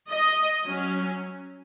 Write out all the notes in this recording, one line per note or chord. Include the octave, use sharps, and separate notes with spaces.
D#5
F#3 C#4